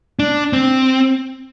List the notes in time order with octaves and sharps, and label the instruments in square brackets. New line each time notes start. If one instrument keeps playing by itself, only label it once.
[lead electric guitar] D4
C4